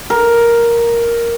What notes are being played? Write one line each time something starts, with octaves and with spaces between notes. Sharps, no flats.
A#4